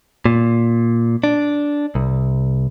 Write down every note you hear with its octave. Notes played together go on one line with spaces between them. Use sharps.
A#2
D4
C2